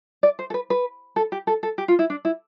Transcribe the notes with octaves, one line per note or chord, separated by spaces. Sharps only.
D5
C5
A4
B4
B4
A4
G4
A4
A4
G4
F4
E4
D4
E4